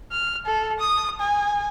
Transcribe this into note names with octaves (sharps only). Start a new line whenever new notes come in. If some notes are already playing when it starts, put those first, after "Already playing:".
F6
A4
D#6
G#5